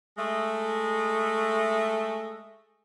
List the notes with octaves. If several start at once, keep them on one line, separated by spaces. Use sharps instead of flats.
G#3 A3